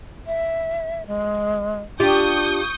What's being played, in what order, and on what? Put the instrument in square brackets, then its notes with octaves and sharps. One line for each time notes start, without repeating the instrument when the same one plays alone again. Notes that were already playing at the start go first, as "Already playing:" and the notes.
[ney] E5
G#3
[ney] D4 [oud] F4 G4 [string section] C#6 D#6 G6